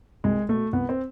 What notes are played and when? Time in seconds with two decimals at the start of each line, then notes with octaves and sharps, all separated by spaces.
0.24 C2 G#3
0.49 B2 A3
0.73 C2 B3
0.89 C4